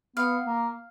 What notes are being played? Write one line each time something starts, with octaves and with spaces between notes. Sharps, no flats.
B3 F5
A#3